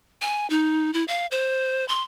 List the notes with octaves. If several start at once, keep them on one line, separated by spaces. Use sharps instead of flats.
G#5
D#4
E4
F5
C5
C6